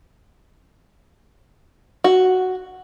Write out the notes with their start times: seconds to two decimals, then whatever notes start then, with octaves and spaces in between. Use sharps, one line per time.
2.04 F#4